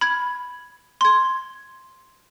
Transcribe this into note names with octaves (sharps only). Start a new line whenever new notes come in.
B5 G#6
C6 G#6